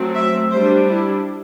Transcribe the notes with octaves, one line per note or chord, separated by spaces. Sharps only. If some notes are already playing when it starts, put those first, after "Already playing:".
Already playing: F#3 A3 C4
E5
G3 D4 C5
E4